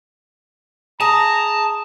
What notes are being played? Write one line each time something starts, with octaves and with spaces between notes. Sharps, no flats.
G#4 A5 A#5